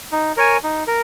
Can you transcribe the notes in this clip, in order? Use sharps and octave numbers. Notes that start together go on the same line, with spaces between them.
D#4
A#4 C#5 G#5
D#4
A#4